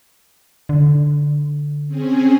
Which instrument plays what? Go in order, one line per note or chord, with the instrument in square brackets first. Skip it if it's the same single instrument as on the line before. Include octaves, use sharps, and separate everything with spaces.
[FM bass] D3
[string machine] C4 C#4 G#4